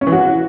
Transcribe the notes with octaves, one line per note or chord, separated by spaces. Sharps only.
C#4
E3
F#4